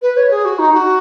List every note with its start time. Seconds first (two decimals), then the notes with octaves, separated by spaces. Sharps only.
0.02 B4
0.17 C#5
0.30 G#4
0.45 F#4
0.59 D#4
0.73 F#4